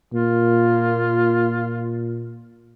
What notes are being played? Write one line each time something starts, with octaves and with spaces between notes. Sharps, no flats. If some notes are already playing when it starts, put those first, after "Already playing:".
A#2 A#3 F4